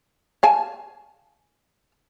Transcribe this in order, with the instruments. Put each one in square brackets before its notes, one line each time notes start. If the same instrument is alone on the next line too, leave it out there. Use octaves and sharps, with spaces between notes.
[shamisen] F5 G#5 A5